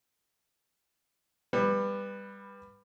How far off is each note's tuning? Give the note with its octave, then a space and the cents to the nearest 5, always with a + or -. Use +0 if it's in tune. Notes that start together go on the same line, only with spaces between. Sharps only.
G3 +20 B3 +0